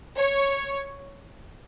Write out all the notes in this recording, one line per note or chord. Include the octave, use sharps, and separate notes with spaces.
C#5